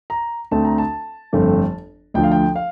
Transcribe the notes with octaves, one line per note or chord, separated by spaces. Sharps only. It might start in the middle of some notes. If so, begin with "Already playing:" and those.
A#5
D2 D3 A3 C4 A5
A#5
A5
G1 F2 D3 A3 C4
D2 D3 F3 G5
F5
G5
F5